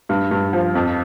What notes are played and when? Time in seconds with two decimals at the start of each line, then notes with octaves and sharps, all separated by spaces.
0.09 G2
0.31 G2
0.53 F3
0.75 F2